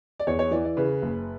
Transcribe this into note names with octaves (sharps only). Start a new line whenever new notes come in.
D5
E2 C#5
C#5
E3 D5
D5
C#3 B4
F#1